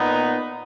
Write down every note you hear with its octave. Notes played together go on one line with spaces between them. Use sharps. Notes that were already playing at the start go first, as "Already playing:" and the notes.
Already playing: A#2 B3 D#4